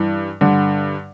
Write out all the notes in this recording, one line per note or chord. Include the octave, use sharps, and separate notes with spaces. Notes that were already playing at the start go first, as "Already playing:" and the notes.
Already playing: G2 E3
G2 D3